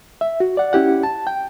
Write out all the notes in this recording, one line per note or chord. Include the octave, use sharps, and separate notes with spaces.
E5
F#4
D5 F#5
C#4 E4 G4 F#5
A5
G5